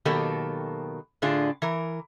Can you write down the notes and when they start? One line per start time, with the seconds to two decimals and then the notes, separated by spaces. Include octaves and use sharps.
0.05 B2 D#3 F#3 A#3 G4 A4
1.22 A2 D3 D4 F4 G#4
1.62 E3 A#4